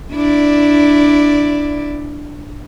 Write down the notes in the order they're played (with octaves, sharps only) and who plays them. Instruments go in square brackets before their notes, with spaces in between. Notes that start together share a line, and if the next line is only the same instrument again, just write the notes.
[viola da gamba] D4 E4 D5